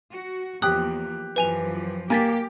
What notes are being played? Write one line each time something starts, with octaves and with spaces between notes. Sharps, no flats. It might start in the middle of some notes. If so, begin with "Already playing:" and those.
F#4
E2 F3 A#3 G4 D#6 F#6
F#2 E3 F3 B4 G#5 F7
A#3 G4 G#5 A6 B6